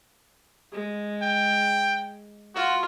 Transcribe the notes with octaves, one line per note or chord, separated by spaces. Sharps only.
G#3
G5
F4 F#4